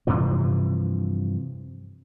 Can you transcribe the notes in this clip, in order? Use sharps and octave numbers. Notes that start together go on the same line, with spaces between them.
G2 C3 E3 F3